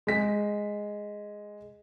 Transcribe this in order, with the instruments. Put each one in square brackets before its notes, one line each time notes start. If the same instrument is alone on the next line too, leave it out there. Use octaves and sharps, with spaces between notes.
[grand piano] G#3 B6